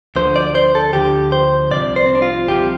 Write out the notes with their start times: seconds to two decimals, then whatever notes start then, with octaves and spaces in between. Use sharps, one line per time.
0.16 D2 D3 F3 C5
0.36 D5
0.55 C5
0.75 A4
0.93 D2 D3 F3 G4
1.32 C5
1.71 C2 C3 F3 D5
1.96 C5
2.06 C4
2.15 D4
2.22 F4
2.48 C2 C3 F3 G4